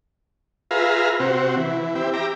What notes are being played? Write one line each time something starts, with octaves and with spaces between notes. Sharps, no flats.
F4 G#4 B4 E5 F5 A#5
C3 C4 F#4
E3
C4 E4 G4
G4 E5 A#5 D6